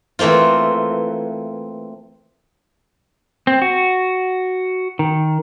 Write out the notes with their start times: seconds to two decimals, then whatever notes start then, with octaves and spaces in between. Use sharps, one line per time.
0.19 E3 A3 A#3 C4 F4
3.47 C4
3.62 F#4
4.99 D#3